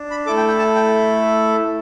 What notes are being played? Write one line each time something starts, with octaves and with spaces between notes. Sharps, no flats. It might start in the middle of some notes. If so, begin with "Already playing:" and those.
Already playing: D4
B5
A3 E4 A4 D6
G5
G5
A5
G5